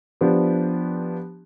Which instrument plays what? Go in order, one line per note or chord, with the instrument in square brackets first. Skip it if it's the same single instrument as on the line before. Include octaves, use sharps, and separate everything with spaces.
[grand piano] F3 B3 D4 G4